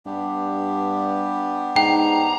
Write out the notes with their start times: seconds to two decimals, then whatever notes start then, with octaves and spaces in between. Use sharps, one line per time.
0.06 G2 B3 D4 G4
1.76 G#2 G5 A#5